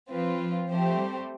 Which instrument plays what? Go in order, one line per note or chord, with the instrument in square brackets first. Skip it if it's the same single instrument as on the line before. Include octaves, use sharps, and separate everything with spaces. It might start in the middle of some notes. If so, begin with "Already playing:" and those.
[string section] F3 [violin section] C4 F4 B4
[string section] F3
[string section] F3 [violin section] A3 C4 G4 C5
[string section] G3